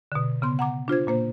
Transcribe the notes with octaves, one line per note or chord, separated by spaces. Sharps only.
B2 D3
C#3 B3 C6
F#5 A#5 D6
D4 F4 C5 G#6
A#2 A#3 C5